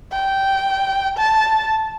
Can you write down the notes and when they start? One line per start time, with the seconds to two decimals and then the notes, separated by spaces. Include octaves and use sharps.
0.12 G5
1.18 A5